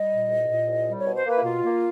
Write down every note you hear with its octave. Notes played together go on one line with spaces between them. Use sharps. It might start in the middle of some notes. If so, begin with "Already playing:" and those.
Already playing: G3 D#5
A#2
C2
A#2
C2
G3
B2 C#5
C5
A#3 B4
E4
B2 F4
A#3